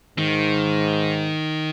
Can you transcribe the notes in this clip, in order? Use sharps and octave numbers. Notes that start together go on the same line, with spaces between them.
G#2 D#3